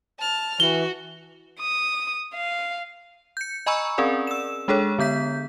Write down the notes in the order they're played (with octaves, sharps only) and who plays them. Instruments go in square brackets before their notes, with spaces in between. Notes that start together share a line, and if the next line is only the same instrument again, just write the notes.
[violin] A5 F6
[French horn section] E3 [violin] F#4 [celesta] G7
[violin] D#6
F5
[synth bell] G6 C#7
D#5 G#5 A#5 B5 C#6 E6
C4 C#4 G#4 A#4 D5
E6 E7
G#3 D4 G#4 A4 C#5
D3 B3 G6 B6